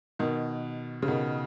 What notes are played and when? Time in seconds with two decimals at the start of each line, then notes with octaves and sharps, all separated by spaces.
0.19 B2 D#3
1.02 C#3
1.08 B2 D#3